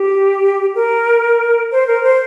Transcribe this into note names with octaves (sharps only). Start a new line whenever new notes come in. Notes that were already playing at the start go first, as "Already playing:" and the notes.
Already playing: G4
A#4
C5
A#4
C5